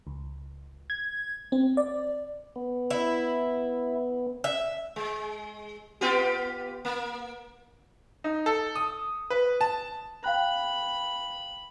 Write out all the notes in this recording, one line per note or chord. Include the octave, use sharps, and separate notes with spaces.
C#2
G#6
C4
D5
B3
E4
E5
G#3
B3 F4 G4
A#3
D#4
A4
D#6
B4
A5
F5 G5 B5 F#6